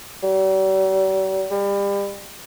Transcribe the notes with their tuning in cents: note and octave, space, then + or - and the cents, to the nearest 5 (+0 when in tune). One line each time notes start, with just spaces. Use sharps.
G3 -45
G3 +35